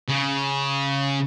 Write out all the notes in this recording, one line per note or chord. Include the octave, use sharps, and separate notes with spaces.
C#3